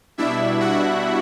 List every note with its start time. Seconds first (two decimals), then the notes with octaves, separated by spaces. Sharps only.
0.18 B2 G3 D4 E4 E5
0.60 F#4 F#5